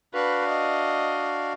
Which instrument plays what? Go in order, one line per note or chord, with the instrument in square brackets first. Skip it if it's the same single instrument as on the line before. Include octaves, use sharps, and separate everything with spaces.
[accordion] D4 F#4 F5 [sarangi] B4
[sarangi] D#5